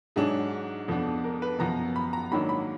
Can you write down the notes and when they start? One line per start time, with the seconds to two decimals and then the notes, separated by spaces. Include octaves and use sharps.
0.16 G#2 F#3 D4 G#4
0.88 F2 F3 B3 D4
1.24 A#4
1.42 B4
1.59 F#2 F3 B3 A#5
1.96 B5
2.13 A#5
2.31 G#2 D#3 F#3 A#3 D4 B5
2.49 B5